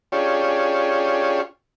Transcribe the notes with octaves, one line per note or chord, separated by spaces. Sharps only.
C#4 D4 F4 G4 G#4 C#5